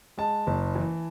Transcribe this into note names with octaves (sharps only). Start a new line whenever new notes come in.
G#3 A5
F#1
E3